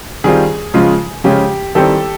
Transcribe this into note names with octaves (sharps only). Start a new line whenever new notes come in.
D#3 G3 C4 F4 G#4
C#3 F3 G#3 C#4 F4
C#3 F3 G#3 C#4 F4 G4
D#3 G3 C4 E4 G4 A4